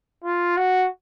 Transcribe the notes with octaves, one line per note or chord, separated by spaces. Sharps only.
F4
F#4